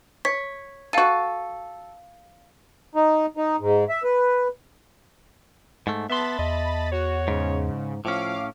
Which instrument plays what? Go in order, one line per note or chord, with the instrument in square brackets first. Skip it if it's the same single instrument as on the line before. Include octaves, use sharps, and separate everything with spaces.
[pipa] C#5 [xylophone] B6
[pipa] F#4 A4 [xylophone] F5 D#7
[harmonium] D#4
D#4
G#2
E5
B4
[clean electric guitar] G#2 A3
[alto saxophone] B3 [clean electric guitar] E5 C6 [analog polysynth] A5 B5 A6
[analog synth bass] E2 [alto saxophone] D#5
[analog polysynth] F#4 [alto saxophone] C#5
[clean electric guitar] G#2 [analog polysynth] C#3
[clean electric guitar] A2 C#4 [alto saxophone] F3 [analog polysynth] F5 D6